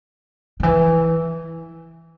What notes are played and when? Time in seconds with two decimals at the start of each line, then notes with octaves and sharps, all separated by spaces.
0.60 D3
0.63 E3